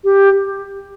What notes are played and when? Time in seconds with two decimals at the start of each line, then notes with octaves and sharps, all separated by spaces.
0.04 G4